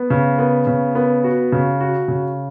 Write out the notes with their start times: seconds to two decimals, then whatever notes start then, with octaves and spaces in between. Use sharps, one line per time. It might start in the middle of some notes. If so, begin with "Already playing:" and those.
Already playing: B3
0.10 C#3
0.38 B3
0.67 C#3
0.95 B3
1.24 F#4
1.52 C#3
1.80 F#4
2.08 C#3